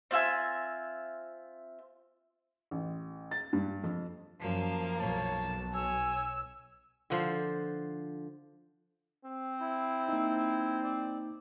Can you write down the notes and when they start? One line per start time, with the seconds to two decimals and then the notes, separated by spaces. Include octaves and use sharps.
0.11 C4 F4 E5 G#5
2.71 A1
3.31 A6
3.53 G2
3.84 F2
4.40 F#2 F3 A#3 A5
5.00 B1 C#5 A5
5.74 C#5 G#5 E6
7.10 D3 F3 C5
9.25 C4
9.60 E4
10.09 A#3 D#4
10.83 D5